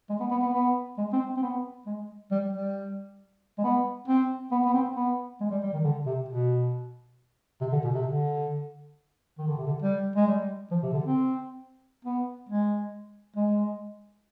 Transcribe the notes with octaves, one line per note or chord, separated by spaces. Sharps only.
G#3
B3
B3
B3
B3
G#3
C4
C4
B3
G#3
G3
G3
G#3
B3
C4
B3
B3
C4
B3
G#3
G3
G3
D#3
D3
C3
B2
C3
D3
B2
C3
D3
D#3
D3
C3
D3
G3
G#3
G3
F3
C3
D3
C4
B3
G#3
G#3